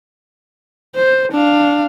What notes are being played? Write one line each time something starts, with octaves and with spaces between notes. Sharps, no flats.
C5
D4 F5